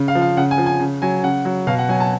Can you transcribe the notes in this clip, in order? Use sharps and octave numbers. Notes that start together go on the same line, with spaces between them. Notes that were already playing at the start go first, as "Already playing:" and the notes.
Already playing: C#3
F5
F3
F5
C#3 F#5
G#5
F3
G#5
C#3
F#3 G#5
C#3 F#5
F#3
B2 F5
F#5
F#3 G#5
A5